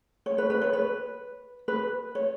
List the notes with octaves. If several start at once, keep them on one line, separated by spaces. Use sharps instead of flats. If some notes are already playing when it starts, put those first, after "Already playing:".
C#5
B4
B4
C#5
B4
B4
C#5